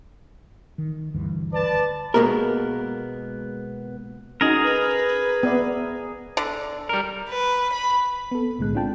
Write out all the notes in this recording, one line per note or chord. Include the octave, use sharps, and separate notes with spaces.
D#3
D2 G2 E3
B4 D5 A5
B2 G#3 A#3 B3 A#4
C#4 D#4 F#4 G#4 A#4
B4
B3 D5 E5
D3
G3 A#4
B4
B5
B3 A4
B1 A2 D3 G#3 F#6
C4 D4 F4 G5 A5